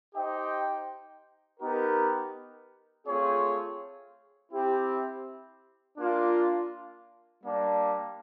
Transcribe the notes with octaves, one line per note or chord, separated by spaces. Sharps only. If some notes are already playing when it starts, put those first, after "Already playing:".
D#4 G4 C5 D#5 G5
B3 D#4 G4 A#4
A3 C4 F4 G#4 C#5
C4 E4 G4
A#3 D4 F4
G3 A#3 D4